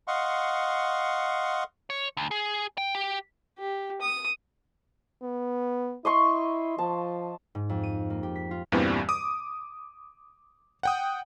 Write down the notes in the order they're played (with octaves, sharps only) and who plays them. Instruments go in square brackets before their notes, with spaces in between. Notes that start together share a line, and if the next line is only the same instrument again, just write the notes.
[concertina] D#5 F5 F#5 C6 C#6
[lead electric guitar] C#5
D2
G#4
G5
G4
[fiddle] G4
D#6
[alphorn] B3
[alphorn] E4 [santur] D#5 C6 C#6
[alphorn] F3 [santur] A5
[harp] G#2
F2
D#7
A#3
G4
B6
F4
[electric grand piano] E2 G2 A#2 E3 G3 C4
D6 D#6
F#5 G5 D#6